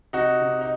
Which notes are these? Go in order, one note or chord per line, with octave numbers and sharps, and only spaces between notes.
C3 D#4 F#4
C3
D#4